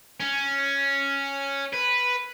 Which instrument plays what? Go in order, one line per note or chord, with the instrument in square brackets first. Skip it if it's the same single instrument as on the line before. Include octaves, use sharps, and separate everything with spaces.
[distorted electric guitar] C#4
B4